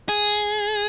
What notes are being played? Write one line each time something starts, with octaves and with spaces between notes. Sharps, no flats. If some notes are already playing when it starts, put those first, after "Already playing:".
G#4